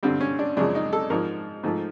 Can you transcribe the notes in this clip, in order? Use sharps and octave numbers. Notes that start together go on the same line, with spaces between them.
G2 D3 G3 C4
C#4
D4
F#2 C#3 F3 G#3 D4
D#4
A4
G#2 F3 G#3 A#4
G#2 F3 A3